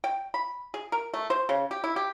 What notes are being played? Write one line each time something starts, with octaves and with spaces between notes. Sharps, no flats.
G5
B5
G#4
A#4
A3
C5
C#3
G4
E4
G4